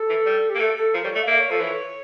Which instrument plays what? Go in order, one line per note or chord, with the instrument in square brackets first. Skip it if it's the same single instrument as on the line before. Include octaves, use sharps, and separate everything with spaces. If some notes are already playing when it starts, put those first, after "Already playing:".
Already playing: [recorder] A4
[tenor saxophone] E3
G3
[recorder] G4
[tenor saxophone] A#3
[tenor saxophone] A3 [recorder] A4
[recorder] A4
[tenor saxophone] F3 [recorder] A#4
[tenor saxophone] G3 [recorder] C#5
[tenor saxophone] A3 [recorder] D5
[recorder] F5
[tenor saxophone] A#3 [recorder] E5
[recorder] D5
C#5
[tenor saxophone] F3 [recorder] A4
[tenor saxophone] E3 [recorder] C#5